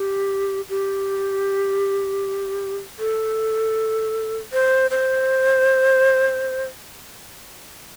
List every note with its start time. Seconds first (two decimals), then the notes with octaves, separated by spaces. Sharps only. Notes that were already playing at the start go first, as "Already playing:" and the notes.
Already playing: G4
0.69 G4
2.99 A4
4.53 C5
4.91 C5